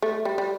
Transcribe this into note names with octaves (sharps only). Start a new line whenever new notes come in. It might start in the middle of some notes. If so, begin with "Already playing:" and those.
A3
G3
G3